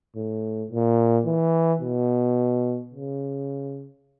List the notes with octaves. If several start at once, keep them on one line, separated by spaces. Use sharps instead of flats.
A2
A#2
E3
B2
C#3